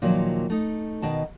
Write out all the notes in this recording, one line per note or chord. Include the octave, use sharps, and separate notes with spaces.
A#2 D#3 F3 F#3 A#3
A3 D#4
B2 D#3 A5